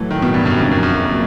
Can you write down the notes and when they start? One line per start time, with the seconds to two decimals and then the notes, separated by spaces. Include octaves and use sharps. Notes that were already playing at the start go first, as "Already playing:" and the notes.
Already playing: A2 E3 F#3 A3
0.11 D#3
0.22 B2
0.34 G2
0.46 F#2
0.58 F2 C#3 F#3 A#3 D4
0.71 F#2
0.83 F#2
0.95 F#2